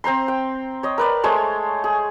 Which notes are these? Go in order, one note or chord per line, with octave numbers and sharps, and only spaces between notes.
C4 C5 A#5 C6
G5
C#5 D#5
A#4 B4 D5
G#3 A3 C5 C#5
G#4